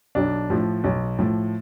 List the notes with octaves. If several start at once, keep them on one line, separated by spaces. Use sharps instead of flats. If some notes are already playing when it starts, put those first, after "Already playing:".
B1 D4
A2 F3
B1
A2 F3